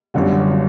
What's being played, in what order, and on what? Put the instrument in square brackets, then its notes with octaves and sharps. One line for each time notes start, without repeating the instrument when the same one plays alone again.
[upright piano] G1 F#2 D3 G3 F#4